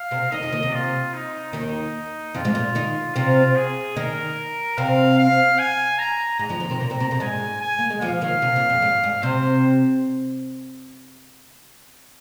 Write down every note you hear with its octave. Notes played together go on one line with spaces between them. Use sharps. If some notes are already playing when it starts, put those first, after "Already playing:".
Already playing: F5
C3 C4
D#3 D#4 D#5
F2 F3
D#2 D#3
C3
F4
D#4
D#2 D#3 D#4
F2 F3 F4
G#2 G#3
A#2 A#3
D#3 D#4
C3 C4 F4
G#4
D#3 D#4 A#4
C3 C4 F5
F5
G#5
A#5
G#2 G#3 A#5
F2 F3
D#2 D#3
C3 C4
A#2 A#3 A#5
C3 C4
C3 C4
A#2 A#3
G#2 G#3 G#5
G#5
A#3
G#3
F2 F3 F5
D#2 D#3
C3
A#2
F2
G#2
G#2
C3 C5